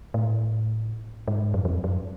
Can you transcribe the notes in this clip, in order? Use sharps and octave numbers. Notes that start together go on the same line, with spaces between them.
A2
G#2
F#2
F2
F#2